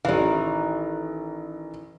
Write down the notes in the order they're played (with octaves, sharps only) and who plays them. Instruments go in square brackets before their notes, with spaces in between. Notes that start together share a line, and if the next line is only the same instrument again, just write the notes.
[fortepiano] A1 F5 [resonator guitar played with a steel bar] D#3 E3